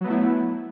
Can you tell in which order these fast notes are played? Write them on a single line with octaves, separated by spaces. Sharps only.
F#3 B3 A3 E4